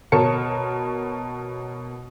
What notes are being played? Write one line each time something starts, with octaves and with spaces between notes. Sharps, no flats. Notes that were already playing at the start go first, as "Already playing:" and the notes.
B2 A#4 C#5 A5 C#7